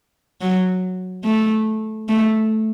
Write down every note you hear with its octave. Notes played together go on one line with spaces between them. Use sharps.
F#3
A3
A3